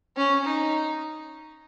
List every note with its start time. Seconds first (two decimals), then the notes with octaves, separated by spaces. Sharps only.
0.17 C#4
0.45 D#4